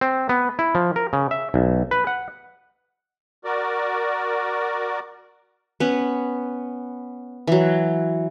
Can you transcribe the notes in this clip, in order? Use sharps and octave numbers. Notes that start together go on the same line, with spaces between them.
C4
B3
E4
F3
A#4
C#3
E5
B1
B4
F#5
F#4 A#4 D5
B3 C#4
E3 F#3